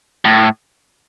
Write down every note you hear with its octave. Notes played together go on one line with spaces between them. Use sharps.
A2